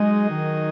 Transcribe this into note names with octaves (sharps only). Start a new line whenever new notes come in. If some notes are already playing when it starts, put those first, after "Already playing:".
Already playing: F#3 G#3 D#4 G#4 D#5
D#3